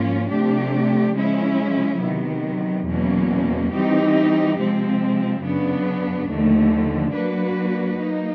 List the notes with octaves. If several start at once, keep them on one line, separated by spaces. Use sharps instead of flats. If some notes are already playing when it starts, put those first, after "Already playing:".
Already playing: G#2 F3 A#3 C#4 F4
C3 F3 A3 D4 G4
C#3 F3 G#3 C#4 E4
C3 D#3 F#3 B3
E2 B2 F#3 A#3 C#4
E3 G3 C4 D#4 G4
C3 F3 G#3 C4
F#2 C#3 F#3 B3 D4
D#2 D3 F3 A3
F#3 A#3 D4 F#4 B4
F#3 A#3 D#4